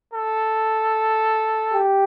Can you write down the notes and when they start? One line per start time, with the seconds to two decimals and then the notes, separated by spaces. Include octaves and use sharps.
0.13 A4
1.73 G4